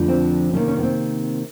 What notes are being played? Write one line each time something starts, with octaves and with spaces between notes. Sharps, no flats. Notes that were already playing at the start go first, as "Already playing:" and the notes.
Already playing: F2 D3 F3 A3
C4
C3 D#3 G3 A#3 C#4
C#4
B3
C4